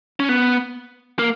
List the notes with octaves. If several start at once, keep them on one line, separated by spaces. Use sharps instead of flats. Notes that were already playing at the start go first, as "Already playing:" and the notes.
C#4
B3
A#3